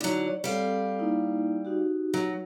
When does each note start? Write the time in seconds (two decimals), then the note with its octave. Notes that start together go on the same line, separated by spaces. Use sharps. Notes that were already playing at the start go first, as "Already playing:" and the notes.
0.01 D3 F#3 D#4 E4
0.28 C#5 D5
0.44 G3 C4 A4 F5
0.99 A#3 D#4 E4
1.65 D#4 F#4 G4
2.14 F#3